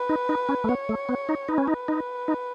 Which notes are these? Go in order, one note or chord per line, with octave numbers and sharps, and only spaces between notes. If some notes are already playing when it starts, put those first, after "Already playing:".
Already playing: B4
D#4
D#4
C#4
A3
B3 C#5
A3
B3
D#4
D#4 B4
C#4
D#4
D#4
D#4